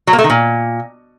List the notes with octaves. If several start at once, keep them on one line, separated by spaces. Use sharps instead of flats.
F#3
A#3
A3
D#3
A#2